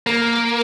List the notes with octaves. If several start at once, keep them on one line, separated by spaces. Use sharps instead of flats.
A#3